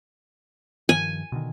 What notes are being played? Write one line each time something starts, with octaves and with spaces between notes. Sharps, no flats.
G2 D#3 F3 G#5
B2 D3 D#3